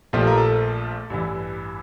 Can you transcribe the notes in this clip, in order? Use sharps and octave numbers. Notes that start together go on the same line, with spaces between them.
A#1 A#2 F3 A3 G4
A#4
A4
A1 G2 E3